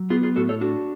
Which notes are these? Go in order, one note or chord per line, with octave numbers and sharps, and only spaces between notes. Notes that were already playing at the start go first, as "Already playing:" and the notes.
Already playing: F#3
B3 F4 G#4
F4 G#4
A2 F#4 A4
A4 C#5
D4 F#4